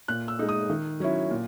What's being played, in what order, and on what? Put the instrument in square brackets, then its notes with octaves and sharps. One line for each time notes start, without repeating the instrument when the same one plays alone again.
[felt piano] A#2 F#6
E6
G#3 D#4
D#6
D#3
F#3 C#4 E4
A#2